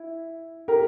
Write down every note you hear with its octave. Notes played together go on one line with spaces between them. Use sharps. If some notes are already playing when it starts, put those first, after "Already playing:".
Already playing: E4
G4 A#4